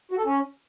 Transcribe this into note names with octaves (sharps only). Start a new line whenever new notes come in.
F#4
A4
C#4